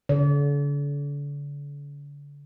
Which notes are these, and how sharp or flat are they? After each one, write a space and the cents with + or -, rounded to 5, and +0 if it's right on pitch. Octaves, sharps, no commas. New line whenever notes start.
D3 -40 D5 -40